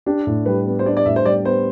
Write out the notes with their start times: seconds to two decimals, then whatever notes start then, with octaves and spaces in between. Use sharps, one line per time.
0.06 D4 G4
0.27 A2
0.46 G3 B4
0.66 B3
0.79 C5
0.86 D4 D5
0.97 D5
1.06 A2 E5
1.16 C5
1.26 G3 D5
1.45 B3 C5